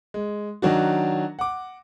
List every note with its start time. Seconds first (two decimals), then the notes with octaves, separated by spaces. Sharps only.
0.14 G#3
0.62 D#3 F#3 D4 F#4
1.39 F#5 D6